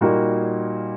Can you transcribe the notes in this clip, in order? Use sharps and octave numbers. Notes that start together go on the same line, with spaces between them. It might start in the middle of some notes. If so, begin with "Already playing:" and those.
A#2 G3 A#3 D#4 F#4